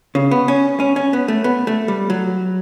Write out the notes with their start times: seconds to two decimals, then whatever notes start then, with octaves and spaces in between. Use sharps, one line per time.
0.15 C#3
0.31 B3
0.48 C#4
0.80 C#4
0.96 C#4
1.13 B3
1.28 A3
1.44 B3
1.67 A3
1.88 G3
2.10 F#3